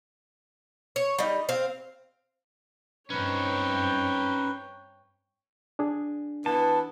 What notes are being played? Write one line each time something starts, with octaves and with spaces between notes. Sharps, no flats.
C#5
G3 D#4
C4 F5
G2 C4 C#4 D#4 B4 C#5 G5
D4 G#4
E3 B3 A5